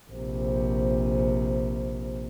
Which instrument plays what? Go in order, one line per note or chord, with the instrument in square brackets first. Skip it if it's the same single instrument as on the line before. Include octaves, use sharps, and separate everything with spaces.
[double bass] A#1 C3